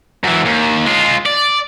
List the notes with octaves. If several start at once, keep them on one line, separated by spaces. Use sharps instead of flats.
F#2 E3
D#2
G#3 F4
D5